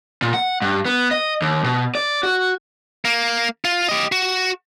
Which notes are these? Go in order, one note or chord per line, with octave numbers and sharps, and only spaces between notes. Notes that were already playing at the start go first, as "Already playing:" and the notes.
A#2
F#5
G2
B3
D#5
D#2
B2
D5
F#4
A#3
F4
G4 D#5
F#4